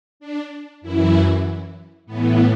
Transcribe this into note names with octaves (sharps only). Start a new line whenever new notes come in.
D4
F#2 E3 E4
A2 E3 B3